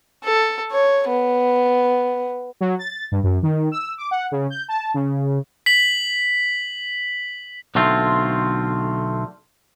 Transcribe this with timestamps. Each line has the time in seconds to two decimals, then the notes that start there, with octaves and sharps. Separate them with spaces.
0.24 A4
0.72 C#5
1.08 B3
2.61 F#3
2.79 A6
3.12 G2
3.23 F#2
3.43 D#3
3.72 E6
3.98 D6
4.11 F#5
4.32 C#3
4.50 G6
4.69 A5
4.94 C#3
5.66 B6 F#7
7.75 B1 D3 A3 C4 F4